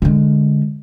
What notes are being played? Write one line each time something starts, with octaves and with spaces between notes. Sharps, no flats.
D3 G#3